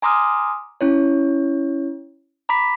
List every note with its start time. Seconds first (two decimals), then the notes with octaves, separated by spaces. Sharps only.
0.02 G#5 A#5 C6 D6 D#6 F6
0.81 C#4 E4 C#5
2.49 A#5 B5 D6 B6